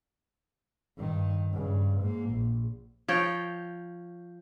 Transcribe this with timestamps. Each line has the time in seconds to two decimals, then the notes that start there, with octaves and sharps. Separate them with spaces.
0.97 G2 D#3
1.52 G2 C#3
2.01 G#2 A#3
2.30 A#1
3.08 F3 C#5 G5